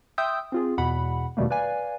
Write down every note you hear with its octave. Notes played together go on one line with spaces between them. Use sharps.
E5 G5 C6 D#6 E6 G6
C4 F4 G#4
E2 B2 F#5 B5
E2 B2 D#3 G3 A3 A#3
B4 D5 F5 G#5